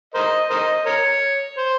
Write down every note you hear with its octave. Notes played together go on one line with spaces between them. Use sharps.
A#4 C5 D#5
A#4 C5 D#5
A#4 C#5
C5